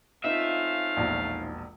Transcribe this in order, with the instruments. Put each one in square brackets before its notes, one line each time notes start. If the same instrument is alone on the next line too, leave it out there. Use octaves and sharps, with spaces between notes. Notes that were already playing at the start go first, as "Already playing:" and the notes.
[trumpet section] A3 C#4 F5 [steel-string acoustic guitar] C4 D#4 F4 [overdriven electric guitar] E5
[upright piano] E1 A#1